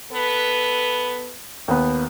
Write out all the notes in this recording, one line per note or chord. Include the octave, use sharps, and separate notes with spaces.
B3 A4 B4
D#2 B3